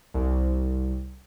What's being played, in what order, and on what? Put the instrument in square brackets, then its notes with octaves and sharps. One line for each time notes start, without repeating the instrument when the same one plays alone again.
[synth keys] C2